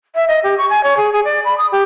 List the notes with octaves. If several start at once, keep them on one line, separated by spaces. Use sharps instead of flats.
E5
D#5
G4
C#6
G#5
C#5
G#4
G#4
D5
B5
D#6
G4